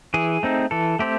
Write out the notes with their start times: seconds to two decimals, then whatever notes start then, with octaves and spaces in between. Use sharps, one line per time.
0.14 E3 G#4
0.43 A3 C4 D#4
0.71 E3 A4
0.99 A3 C4 G4